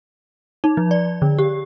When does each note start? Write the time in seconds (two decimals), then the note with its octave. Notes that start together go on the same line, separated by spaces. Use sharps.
0.64 D#4
0.77 F3
0.91 D5
1.22 D3
1.39 G4